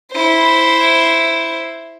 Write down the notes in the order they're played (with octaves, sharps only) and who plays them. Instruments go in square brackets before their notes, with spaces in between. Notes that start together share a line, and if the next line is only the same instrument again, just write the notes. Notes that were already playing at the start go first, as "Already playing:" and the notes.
[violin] E4 C5